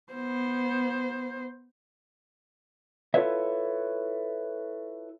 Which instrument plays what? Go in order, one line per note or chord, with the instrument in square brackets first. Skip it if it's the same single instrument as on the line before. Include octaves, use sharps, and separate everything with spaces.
[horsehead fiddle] B3 C5
[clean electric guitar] E4 F4 A4 B4 C#5 E5